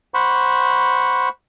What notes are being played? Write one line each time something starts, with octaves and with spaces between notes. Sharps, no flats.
C5 F#5 B5 C#6